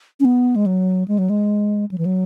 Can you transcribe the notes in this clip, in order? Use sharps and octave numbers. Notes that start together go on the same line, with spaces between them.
C#4
B3
G#3
F#3
G#3
F#3
G#3
F#3
E3
F#3